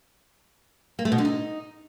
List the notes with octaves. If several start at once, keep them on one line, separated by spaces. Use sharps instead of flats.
A#3
A3
B2
D3
D#4